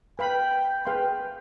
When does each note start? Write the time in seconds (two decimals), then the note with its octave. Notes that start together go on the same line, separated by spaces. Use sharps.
0.19 B4 F5 G5 B5
0.85 G#4 B4 F5 G5 C6